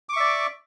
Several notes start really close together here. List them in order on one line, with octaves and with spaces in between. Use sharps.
D6 C#6 E5 D5